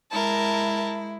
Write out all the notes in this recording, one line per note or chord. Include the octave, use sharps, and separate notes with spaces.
G#3 E4 A#4 A5